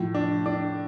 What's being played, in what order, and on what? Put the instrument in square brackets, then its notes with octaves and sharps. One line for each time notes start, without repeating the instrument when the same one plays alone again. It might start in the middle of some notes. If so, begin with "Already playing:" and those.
Already playing: [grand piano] A2 [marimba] F3 F4
[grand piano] D4
D4